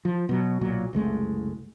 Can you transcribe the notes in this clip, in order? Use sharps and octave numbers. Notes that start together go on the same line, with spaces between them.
F3
B2 F#3
B1 A#2 F#3
F#1 C2 G#3 A3